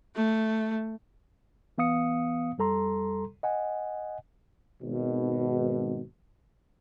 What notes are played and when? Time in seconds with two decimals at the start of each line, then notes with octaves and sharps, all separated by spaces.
0.16 A3
1.78 E3 B3 F5 D#6 C#7
2.58 F2 G3 A4 A#5 C6
3.43 D#5 F#5 G#5
4.82 G#1 B2